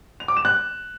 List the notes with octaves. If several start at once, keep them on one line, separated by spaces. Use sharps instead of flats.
F7
D6
E7
F#6